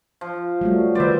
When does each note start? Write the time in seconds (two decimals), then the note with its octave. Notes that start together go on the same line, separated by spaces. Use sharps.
0.21 F3
0.61 F#3 G3 A3
0.95 D#3 B4 C5 D5 E5